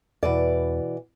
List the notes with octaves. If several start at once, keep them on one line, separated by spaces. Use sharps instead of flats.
E2 B2 E3 D5